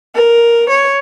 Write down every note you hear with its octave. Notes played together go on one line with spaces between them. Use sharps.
A#4
C#5